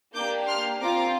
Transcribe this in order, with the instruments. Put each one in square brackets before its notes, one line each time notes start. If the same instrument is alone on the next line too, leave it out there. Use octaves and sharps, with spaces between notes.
[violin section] A#3 D4 G4 D6 G6
C6 F6
C4 F4 A#5 D6